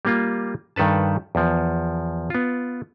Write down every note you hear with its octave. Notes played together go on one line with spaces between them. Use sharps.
G3 A#3 F4
G2 D#3 A4 B4 A5
E2 F3
B3 F4